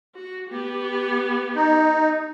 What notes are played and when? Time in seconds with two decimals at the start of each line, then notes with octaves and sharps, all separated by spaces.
0.15 F#4
0.49 B3 G4
1.55 D#4